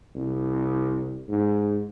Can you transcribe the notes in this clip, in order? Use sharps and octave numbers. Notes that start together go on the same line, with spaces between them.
C2
G#2